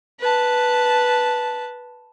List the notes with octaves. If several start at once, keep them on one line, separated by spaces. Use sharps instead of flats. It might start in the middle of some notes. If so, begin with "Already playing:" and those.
B4 A5